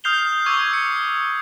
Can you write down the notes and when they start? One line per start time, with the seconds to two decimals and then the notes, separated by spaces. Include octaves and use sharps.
0.04 D#6 F6 G6 C7 F7 G7
0.46 C#6 D6 E6 G#6
0.73 C#7